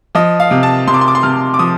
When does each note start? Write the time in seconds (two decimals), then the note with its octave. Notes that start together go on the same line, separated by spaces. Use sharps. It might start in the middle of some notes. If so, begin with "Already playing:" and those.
0.15 F3 D#5
0.40 F5
0.51 C3
0.63 A5
0.87 C3 C6
0.94 D6
1.01 C6
1.08 D6
1.15 C6
1.23 C3 F6
1.54 D6
1.59 F3 D#6